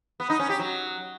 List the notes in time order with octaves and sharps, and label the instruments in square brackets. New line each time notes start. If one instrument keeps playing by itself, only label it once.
[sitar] B3
D#4
C#4
G4
F#3